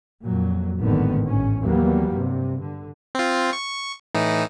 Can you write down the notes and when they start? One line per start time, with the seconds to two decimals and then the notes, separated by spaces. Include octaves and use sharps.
0.23 F2 A#2 F#3
0.79 G#1 A2 D3 D#3 B3
1.27 A1 G#2 C#4
1.61 D#2 E3 F#3 G3 A#3 B3
2.11 G2 C3
2.60 D3
3.15 C4 F4
3.53 C#6
4.15 A2 E3 D#4